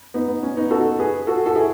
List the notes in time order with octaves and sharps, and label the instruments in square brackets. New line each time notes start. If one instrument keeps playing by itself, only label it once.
[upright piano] B3 D#4
B3
C#4
B3 D#4
F#4 A4
G#4 B4
F#4 A4
F#4 A4
E4 G#4